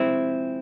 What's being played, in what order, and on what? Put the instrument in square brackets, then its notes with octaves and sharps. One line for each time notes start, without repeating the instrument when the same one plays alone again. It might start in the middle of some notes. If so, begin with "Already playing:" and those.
Already playing: [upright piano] C3 F3 G#3 [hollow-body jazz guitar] C4 E4